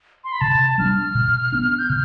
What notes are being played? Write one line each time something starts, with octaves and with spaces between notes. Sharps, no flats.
C6
B5
C3 A5
G3 B3 D4 F6
B2
B3 D4
G6
C3 F6